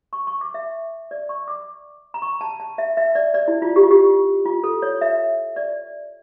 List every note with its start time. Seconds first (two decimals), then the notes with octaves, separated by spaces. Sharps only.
0.13 C#6
0.27 C#6
0.41 D6
0.54 E5
1.11 D5
1.29 C#6
1.48 D6
2.14 A#5
2.22 C#6
2.41 A5
2.60 A5
2.78 E5
2.97 E5
3.15 D5
3.34 D5
3.48 E4
3.62 F4
3.76 G4
3.83 F4
3.91 G4
4.46 F4
4.64 A4
4.82 C#5
5.01 E5
5.56 D5